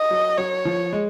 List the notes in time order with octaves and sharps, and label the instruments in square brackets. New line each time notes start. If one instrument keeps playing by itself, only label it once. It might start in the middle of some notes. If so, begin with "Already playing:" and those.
Already playing: [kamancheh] D#5
[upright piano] F#3
[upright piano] F#3 [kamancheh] C#5
[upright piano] F3
G#3